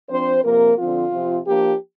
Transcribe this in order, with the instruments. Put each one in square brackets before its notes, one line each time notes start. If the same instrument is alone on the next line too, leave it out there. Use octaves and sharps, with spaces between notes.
[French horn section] F3 C4 D4 C5
C3 F3 A#3 C4 A#4
D3 F3 C4 F4
C3 F3 C4
F3 A#3 D4 G4